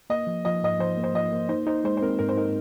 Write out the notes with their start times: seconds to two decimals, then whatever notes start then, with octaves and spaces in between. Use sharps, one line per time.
0.10 A#3 D#5
0.27 F3
0.45 F3 D#5
0.63 G#2 D#5
0.79 F3 C5
0.97 A#3
1.04 C5
1.14 F3 D#5
1.32 A#3
1.49 D#4 C5
1.67 D#4 C5
1.84 G#3 C5
1.97 C5
2.01 C4 A#4
2.19 G#2 A#4
2.29 C5
2.37 D#4 A#4